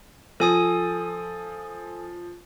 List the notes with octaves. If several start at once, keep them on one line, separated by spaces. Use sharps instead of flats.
F3 A4 G#5 D#6